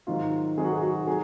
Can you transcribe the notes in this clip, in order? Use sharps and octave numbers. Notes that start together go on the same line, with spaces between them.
G#2 D#3 F#3 F4
G#2 D#3 F#3 G#4
F#4
G#4
F#4
F#3 G#4